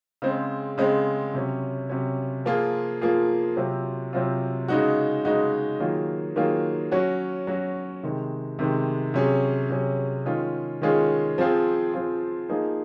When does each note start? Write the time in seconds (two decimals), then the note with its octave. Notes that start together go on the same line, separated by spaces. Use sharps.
0.22 C#3 G#3 C4
0.78 C#3 G#3 C4
1.34 C3 F#3 C#4
1.90 C3 F#3 C#4
2.45 F3 A#3 F4 G#4
3.01 F3 A#3 F4 G#4
3.57 C3 F#3 C4 F4
4.13 C3 F#3 C4 F4
4.68 C#3 G#3 D#4 F#4
5.25 C#3 G#3 D#4 F#4
5.80 D#3 F#3 A#3 F4 G#4
6.36 D#3 F#3 A#3 F4 G#4
6.92 F#3 C#4 F#4
7.47 F#3 C#4 F#4
8.03 C3 D#3 G#3
8.59 C3 D#3 G#3
9.14 C3 F#3 C#4 G#4
9.70 C3 F#3 C#4 G#4
10.26 D#3 G#3 C#4 F4 G#4
10.82 D#3 G#3 C#4 F4 G#4
11.38 F3 C4 F4 G#4
11.93 F3 C4 F4 G#4
12.49 F3 A#3 D#4 G#4